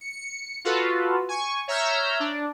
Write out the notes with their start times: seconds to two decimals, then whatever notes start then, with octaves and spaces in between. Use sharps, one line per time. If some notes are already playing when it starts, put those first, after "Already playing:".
0.01 C#7
0.65 F4 F#4 A4 B4
1.29 G#5 C#6
1.68 C#5 E5 A#5 E6 F6 G6
2.20 D4